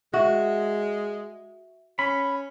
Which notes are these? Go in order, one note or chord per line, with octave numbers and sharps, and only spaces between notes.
G#3 F#4 E5
C#4 B5